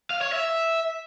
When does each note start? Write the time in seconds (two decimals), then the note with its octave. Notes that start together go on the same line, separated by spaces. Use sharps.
0.10 F5
0.21 C#5
0.32 E5